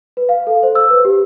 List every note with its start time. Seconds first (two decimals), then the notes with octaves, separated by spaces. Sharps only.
0.17 B4
0.29 F5
0.47 A4
0.63 C5
0.75 E6
0.90 B4
1.05 G4